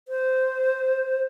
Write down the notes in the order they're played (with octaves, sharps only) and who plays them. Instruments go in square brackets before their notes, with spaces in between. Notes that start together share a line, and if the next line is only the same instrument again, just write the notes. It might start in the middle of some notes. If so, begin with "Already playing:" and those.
[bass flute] C5